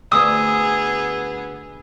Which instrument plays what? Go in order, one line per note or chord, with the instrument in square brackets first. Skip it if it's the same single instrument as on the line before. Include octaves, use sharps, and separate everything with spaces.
[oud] D2 [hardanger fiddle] B3 G#4 [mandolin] D#6 [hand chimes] E6